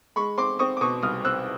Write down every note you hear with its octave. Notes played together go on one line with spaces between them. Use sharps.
G#3 B5 C#6
C4 C6 D6
C4 C#6 D#6
D6
B2 C#6 D#6
C2 D#6 F6
C4 E6 F#6